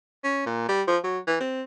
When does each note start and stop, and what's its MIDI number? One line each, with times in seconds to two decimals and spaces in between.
0.24 0.43 61
0.47 0.67 46
0.69 0.83 55
0.88 0.98 53
1.04 1.19 54
1.27 1.38 52
1.41 1.62 60